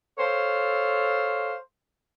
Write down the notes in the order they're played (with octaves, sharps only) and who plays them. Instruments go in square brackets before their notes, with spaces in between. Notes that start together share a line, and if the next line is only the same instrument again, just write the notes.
[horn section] A4 C5 C#5 F5